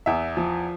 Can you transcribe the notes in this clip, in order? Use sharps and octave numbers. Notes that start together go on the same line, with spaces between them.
E2 E5
F3